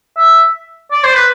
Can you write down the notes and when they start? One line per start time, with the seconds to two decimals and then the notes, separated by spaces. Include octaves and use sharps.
0.17 E5
0.92 D5
1.04 C5
1.15 B4